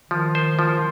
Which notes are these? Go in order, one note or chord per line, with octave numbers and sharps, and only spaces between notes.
D#3 F3
C5
F3